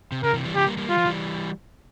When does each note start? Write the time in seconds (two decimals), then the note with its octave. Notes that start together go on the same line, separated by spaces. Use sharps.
0.12 C3
0.23 C#3 A#4
0.33 C3 E3
0.45 E3 G3
0.55 C#3 F3 G4
0.66 G3 A#3
0.78 G3 A#3
0.89 G3 F4
0.98 F3
1.06 E3 G3